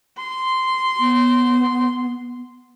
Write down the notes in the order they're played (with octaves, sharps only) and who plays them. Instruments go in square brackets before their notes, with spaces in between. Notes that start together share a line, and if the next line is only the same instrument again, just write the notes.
[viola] C6
[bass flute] B3